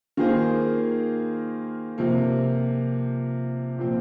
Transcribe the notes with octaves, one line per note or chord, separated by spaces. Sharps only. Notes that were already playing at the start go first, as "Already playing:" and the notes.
D#3 A#3 F4 G#4 C5
C3 F3 A#3
A#2 F3 C4